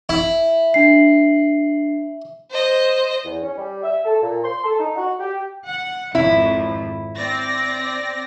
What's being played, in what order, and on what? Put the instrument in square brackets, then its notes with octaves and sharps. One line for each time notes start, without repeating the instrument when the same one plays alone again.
[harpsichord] E4
[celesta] D4 C7
[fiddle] C5 D#5
[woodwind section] E2
C#4
G3
E5
A4
A#2
C6
A4
D#4
F#4
G4
[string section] F#5
[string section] G#1 F2 [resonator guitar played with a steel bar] E4
[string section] C4 D5 A#6